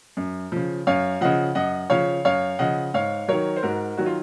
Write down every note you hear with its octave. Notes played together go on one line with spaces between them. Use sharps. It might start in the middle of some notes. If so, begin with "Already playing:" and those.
F#2
C#3 F3
F#2 C#5 F5
C#3 F3 D#5 F#5
F#2 D#5 F#5
C#3 F3 C#5 F5
F#2 C#5 F5
C#3 F3 D#5 F#5
G#2 C#5 F5
D#3 F#3 A#4 C#5
C5
G#2 F#4 A#4
D#3 F#3 F#4
F4